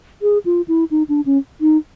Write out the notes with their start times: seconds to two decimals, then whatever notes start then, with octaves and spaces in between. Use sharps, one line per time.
0.22 G#4
0.45 F4
0.68 E4
0.91 D#4
1.09 D4
1.26 C#4
1.61 D#4